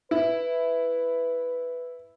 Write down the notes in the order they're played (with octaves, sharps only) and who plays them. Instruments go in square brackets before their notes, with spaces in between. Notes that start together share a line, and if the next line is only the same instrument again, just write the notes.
[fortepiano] E4 [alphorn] B4